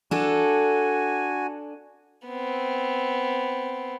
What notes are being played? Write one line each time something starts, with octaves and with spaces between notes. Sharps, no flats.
D4 F#4 A4 G#5
B3 C4